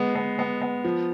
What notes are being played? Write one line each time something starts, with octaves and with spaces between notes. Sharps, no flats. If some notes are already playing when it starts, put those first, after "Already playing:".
Already playing: G#3 B3
B3
B3
B3
F3